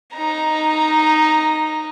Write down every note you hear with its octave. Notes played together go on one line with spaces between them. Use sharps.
D#4 A#5